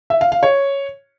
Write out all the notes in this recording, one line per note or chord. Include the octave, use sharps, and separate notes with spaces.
E5
F5
F5
C#5